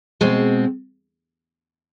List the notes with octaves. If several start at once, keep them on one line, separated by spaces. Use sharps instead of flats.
B2 G#3 C4